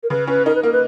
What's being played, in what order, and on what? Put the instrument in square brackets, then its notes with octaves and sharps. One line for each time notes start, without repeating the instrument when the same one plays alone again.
[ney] A#4
[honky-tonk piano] C#3 [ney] B4
[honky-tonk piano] C#4 [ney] B4
[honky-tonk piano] D#4 [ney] A#4
[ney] B4
[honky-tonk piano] A#3 [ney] A#4
[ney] B4